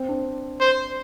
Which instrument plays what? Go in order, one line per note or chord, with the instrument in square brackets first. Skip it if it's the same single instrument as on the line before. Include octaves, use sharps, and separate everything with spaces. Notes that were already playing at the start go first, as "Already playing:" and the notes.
Already playing: [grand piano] C4
D4
[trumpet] C5